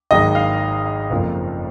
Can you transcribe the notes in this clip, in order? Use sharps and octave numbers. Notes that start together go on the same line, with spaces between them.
G#1 G#2 D#3 F#3 A#3 D#5
F5
F#1 F2 F3 A#3